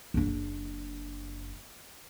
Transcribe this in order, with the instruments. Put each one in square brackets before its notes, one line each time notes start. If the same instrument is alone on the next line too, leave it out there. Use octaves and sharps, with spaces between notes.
[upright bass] F#1 D4